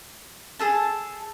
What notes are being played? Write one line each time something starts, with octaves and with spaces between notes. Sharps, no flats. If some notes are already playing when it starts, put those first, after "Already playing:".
G#4 A4 A5